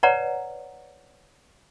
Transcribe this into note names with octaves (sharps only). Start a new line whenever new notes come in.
B4 C#5 D5 F#5 A#5